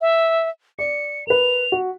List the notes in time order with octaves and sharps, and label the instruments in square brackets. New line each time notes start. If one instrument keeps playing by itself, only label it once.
[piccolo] E5
[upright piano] D5 [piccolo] C#7
[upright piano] A#4 B4 [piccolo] F7
[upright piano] F#4